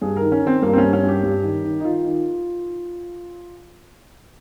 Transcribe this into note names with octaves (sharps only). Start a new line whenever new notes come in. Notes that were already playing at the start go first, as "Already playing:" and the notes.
G2 G#4
D#3 A#4
C#4
D#3
C4
G2 A#3
C4
G2 C#4
C#4
G2
G4
G2
D#3
D#3
D#4
D#3 F4
D#3